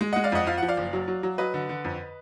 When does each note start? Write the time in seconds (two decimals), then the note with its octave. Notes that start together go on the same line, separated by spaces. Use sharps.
0.01 G#3
0.13 G#3 D#5 F#5
0.24 D5 F5
0.32 F2 D#5 F#5
0.47 F3 F5
0.58 F3 F#5
0.68 D5 F5
0.77 F#1
0.93 F#3
1.08 F#3
1.23 F#3
1.38 F#3 B4 D#5
1.54 D3
1.69 D3
1.84 F2